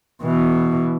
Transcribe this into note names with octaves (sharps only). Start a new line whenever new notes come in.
B2 E3